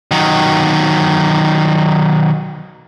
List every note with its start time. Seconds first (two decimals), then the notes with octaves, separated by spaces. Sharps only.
0.11 D#3 F#3